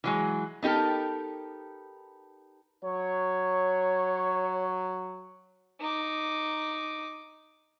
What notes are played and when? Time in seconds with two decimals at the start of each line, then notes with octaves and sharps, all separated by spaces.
0.04 E3 F#3 G#3
0.63 B3 D#4 G4 A4 A#4
2.84 F#3 C#5
5.80 D#4 D6